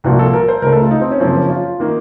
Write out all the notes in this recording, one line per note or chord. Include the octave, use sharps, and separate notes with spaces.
C2 A#2 F3 A#3 F#4
A4
A#4
C5
C#2 C#3 A3 A#4
A4
F4
D#4
C4
C#4
F#2 C#3 F3 A#3 C4
C#4
F4
D#3 A#3